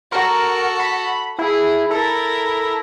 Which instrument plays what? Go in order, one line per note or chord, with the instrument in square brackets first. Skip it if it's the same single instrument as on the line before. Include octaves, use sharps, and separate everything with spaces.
[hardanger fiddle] F#4 A4 [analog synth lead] A#4
[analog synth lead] B5
[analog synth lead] E4 [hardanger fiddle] G#4
[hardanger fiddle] E4 A#4 [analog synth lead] A4